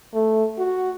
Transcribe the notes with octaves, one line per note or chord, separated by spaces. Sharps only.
A3
F#4